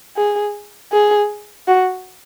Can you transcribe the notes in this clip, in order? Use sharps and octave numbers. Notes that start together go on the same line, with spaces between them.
G#4
G#4
F#4